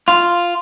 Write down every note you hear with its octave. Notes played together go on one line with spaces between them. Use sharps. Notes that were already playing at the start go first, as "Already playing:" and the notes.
F4